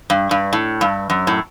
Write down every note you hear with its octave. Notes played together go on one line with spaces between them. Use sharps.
G2
G2
A2
G2
F#2
A2